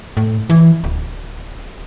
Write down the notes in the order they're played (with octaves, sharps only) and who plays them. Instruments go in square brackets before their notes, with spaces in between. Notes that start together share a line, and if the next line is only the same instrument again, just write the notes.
[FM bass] A2
E3
D1